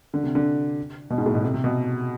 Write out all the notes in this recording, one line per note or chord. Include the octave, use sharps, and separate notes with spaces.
D3
C3
D3
B2
G#2
A2
B2
C3
C3
B2